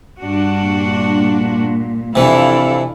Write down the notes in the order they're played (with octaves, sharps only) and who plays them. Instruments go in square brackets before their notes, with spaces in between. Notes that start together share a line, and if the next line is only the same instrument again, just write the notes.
[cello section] G2 D4 F#4
[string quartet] A#2
[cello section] F2 A4 F5 [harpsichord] C3 E3 [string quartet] D4 E4